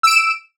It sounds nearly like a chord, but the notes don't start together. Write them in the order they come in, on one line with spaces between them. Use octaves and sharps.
E6 D7 E7